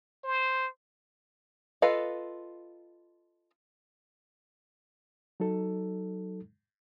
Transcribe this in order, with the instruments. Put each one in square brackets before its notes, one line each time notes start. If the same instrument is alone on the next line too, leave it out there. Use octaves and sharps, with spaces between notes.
[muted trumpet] C5
[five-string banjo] F4 A4 B4 D#5 F5
[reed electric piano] F#3 D#4 A4